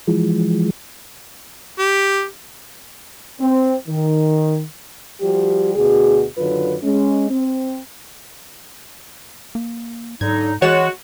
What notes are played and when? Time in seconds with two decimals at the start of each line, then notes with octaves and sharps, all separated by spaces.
0.07 E3 F3 G#3
1.79 G4
3.40 C4
3.88 D#3
5.21 F3 G3 F#4 G4
5.75 D2 B2 F#4 G#4
6.38 F#2 D3 D#3 F#3 F4 B4
6.83 G#3 C#4
7.31 C4
9.55 A#3
10.21 G#2 D3 F#3 D#4 G#6
10.62 E3 G#3 F#4 C#5 A6 E7